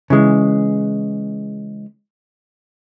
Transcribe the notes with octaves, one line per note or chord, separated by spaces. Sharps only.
C#3 E3 G#3